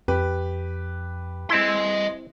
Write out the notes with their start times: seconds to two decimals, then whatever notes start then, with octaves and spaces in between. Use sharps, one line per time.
0.08 F2 G4 B4
1.50 C4 E4 D#5 C6